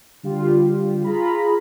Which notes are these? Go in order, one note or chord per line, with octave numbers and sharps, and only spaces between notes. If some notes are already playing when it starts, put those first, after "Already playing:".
D3 G3 F4 G4
F4 G#4 A#5 B5